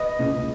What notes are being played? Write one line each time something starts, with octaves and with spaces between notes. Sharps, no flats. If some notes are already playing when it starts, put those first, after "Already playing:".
Already playing: B4 D#5
C#2